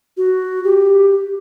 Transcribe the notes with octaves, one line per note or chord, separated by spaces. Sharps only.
F#4
G4